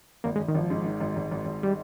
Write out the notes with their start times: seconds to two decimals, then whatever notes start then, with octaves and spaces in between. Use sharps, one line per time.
0.24 G#1 A#3
0.36 G#3
0.39 G#1
0.48 D#3
0.55 G#1 F3
0.70 G#2
0.85 D#3
1.01 G#1
1.16 G#1
1.31 G#1
1.45 G#1
1.63 G3